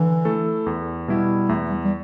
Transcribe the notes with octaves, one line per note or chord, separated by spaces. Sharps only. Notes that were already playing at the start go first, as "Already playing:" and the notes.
Already playing: D3 E3
A3 E4 A4
E2
B2 G3 E4
E2 A3
G3
G3